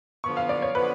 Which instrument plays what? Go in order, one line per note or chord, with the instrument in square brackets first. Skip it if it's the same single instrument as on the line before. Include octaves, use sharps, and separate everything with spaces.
[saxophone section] D3 F3 B3 [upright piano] C#6
[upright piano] F5
D5
C#5
[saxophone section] D3 F3 B3 [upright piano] B4